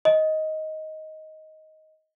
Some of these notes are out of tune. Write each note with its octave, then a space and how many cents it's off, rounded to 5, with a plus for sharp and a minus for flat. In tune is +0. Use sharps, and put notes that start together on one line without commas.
D#5 +10